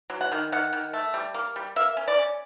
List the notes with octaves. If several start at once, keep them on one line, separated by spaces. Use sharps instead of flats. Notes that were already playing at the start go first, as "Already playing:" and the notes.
F#3
F#5
D#3
D#3 F#5
D#3
A3
G3
A#3
G3
A#3 E5
C#4
D5
C#4